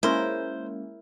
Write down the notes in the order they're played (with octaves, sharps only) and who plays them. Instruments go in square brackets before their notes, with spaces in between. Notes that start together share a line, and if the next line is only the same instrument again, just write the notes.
[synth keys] G#3 A#3 C#4 [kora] E4 A#4 [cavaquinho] C5